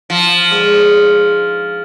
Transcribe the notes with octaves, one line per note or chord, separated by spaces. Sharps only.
F3
G#2 D3 C#6